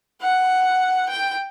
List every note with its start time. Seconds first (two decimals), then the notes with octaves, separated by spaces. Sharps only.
0.21 F#5
1.09 G5